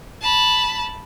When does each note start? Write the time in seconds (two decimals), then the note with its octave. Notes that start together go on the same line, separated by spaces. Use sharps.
0.22 A5 B5